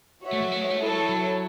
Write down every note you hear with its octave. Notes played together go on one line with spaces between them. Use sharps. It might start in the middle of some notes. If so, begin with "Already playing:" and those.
F#4 C#5 E5
A3
F#3
A3
G#3
A3
G#3 E4 A4 C#5
F#3
E3
F#3